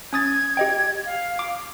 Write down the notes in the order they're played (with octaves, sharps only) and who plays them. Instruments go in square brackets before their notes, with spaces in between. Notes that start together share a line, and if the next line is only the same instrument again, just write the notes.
[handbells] C#4 D#6 A6 [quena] G#6
[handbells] G4 D#5 G5
[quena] F5
[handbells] D6